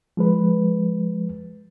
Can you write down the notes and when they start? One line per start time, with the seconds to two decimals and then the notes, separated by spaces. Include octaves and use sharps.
0.17 F3 G#3 B4